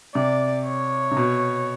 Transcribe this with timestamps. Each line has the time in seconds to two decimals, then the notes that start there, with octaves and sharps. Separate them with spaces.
0.15 C3 D5
0.66 C#5
1.11 C3
1.17 B2